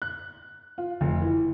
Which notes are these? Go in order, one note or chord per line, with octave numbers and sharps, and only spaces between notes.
F#6
F4
F1
E3